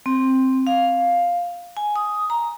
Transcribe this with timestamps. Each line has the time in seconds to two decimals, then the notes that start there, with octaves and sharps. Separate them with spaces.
0.06 C4
0.67 F5
1.77 G#5
1.96 D#6
2.30 A#5